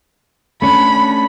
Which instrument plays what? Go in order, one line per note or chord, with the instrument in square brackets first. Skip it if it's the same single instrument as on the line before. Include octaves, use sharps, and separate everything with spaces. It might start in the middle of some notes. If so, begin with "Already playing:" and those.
[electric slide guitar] A3 C#4 D4 [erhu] B5